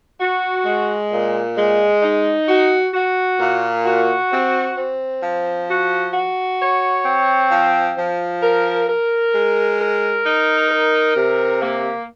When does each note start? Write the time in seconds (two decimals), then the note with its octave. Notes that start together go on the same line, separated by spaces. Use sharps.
0.20 F#4
0.66 G#3
1.12 A#2
1.57 G#3
2.03 D#4
2.48 F#4
2.94 F#4
3.40 A#2
3.85 F#4
4.31 C4
4.77 C4
5.23 F3
5.69 F#4
6.14 F#4
6.59 C#5
7.05 C4
7.51 F3
7.97 F3
8.42 A#4
8.88 A#4
9.34 G#3
9.79 A#4
10.24 D#4
10.70 A#4
11.16 C3
11.62 A#3